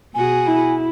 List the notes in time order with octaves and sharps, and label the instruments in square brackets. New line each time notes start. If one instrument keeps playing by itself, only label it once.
[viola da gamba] B2 F#4 G#4 [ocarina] G#5
[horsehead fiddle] E4